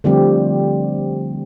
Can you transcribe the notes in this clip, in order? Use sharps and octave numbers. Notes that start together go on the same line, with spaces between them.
D3 F3 G3 A3 C4 G4